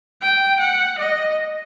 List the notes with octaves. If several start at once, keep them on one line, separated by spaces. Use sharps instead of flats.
G5
F#5
D#5